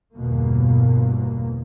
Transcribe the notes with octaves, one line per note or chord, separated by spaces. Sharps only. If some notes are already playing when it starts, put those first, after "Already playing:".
G1 E2 B2 A#3